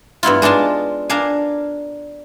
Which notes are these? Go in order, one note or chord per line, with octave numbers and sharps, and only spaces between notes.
G2 B3 E4 F4
G#3 D4 D#4 F4 A5
D4 A#4 F5 G#5